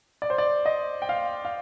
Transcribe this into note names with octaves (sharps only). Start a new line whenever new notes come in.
D5
C5
D5
D#5
G5
F5
F5